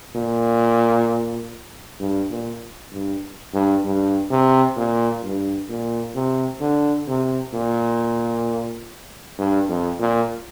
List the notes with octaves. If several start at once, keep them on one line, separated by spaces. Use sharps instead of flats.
A#2
G2
A#2
G2
G2
G2
C3
A#2
G2
A#2
C3
D3
C3
A#2
G2
F2
A#2